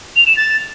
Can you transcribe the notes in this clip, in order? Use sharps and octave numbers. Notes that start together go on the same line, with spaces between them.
F7
E7
A6